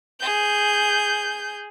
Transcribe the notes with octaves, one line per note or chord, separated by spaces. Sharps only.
G#4 G6